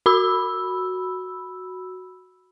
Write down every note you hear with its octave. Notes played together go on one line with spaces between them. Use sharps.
F#4 B5 E6